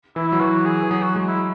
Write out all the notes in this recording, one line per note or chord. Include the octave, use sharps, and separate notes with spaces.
E3 E4
F#3 E4
E3 F#4
G#4
E3
F#3 G#4
F#4
G#3
E4